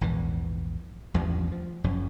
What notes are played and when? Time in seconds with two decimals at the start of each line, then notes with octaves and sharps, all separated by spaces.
0.01 A#1 E2 G#2 E3
1.14 A1 E2 G2 F3
1.52 F3
1.84 F#1 F#2 C#3 F3